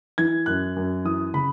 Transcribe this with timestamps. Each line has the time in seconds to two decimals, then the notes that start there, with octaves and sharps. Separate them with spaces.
0.18 E3 G#6
0.46 F#2 F#6
0.76 F#2
1.05 E3 D#6
1.34 C#3 B5